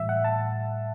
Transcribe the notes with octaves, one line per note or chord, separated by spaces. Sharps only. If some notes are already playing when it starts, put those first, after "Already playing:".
Already playing: A2 E3 G3 E5
F#5
A5